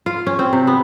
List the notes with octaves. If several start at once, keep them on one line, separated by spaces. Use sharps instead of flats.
F4
C#4
C4
C3
B3